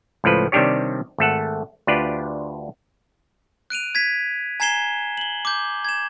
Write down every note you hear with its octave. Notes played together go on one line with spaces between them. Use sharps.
C#2 A2 F3 B4
C3 D#3 G3 D4 G4 C#5
G#1 A3 A4 F#5
D2 D4 F4 G4 B4 D5
F#6 D7 D#7 F7
G#6 B6
G#5 A#5 G#6 C7 E7 G7
F#7 G7
D6 G6
G#6 E7